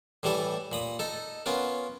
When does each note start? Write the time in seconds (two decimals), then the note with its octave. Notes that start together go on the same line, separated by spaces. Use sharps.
0.23 A2 E3 G3 A3 A4
0.72 A#2 B5 D#6
0.99 D#4 A4
1.46 B3 C#4 F4 A#4